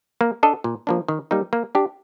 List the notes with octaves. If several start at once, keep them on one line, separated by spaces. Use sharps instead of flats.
A#3
D4 A4 D#5
A#2
F3 A#3 D4
D#3
G3 A#3 D#4
A#3
D4 G4